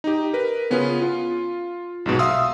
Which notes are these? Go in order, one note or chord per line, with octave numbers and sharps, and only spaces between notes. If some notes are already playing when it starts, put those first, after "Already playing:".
D#4 G4
A#4 B4
C#3 B3 C#4 F4 B4
F4
B1 G#2 B2
E5 F5 C6 D#6 E6